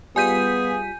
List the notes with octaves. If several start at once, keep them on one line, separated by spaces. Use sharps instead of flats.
G3 B3 F4 G#4 G#5 G6 B6 D#7